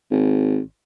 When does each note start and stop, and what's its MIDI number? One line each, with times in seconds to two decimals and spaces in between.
0.11 0.60 32